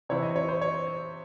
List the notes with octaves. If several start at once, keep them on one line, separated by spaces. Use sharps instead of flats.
C3 E3 C4 E4 C#5
D#5
C#5
C5
C#5